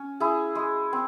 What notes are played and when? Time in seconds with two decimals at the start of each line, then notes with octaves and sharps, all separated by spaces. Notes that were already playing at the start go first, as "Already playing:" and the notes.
Already playing: C#4
0.20 E4 G#4
0.55 G#3
0.93 C4